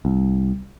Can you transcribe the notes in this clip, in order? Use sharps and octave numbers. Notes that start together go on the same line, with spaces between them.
C2